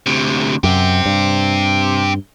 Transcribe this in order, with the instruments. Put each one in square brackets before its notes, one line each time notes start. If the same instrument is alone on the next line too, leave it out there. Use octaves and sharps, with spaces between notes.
[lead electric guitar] D2 C3
[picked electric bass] F#2 [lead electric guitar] C4 G4
[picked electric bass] G2